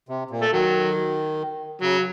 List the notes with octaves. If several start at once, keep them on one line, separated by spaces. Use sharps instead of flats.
C3
A#2
A3
D#3 F#3
C#3 F#3